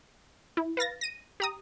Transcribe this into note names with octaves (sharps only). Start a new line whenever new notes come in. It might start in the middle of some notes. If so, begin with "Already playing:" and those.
E4
B4 F5 A6 A#6
A#6 D#7
G4 A#5 D#6